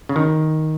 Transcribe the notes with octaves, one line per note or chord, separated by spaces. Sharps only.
C#3
D#3